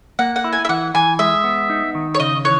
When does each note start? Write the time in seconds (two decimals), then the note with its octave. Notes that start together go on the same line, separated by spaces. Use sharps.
0.19 A#3 F#5
0.36 F#5
0.44 E4
0.53 G#5
0.65 E5
0.69 E3 F#5
0.94 E3 G#5
1.19 G#3 E5
1.44 B3
1.70 D#4
1.95 D#3
2.15 C#5
2.20 C#3 D#5
2.45 E3 C#5